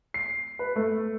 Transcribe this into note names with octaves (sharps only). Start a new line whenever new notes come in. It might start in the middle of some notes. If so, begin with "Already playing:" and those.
C7
B4
A3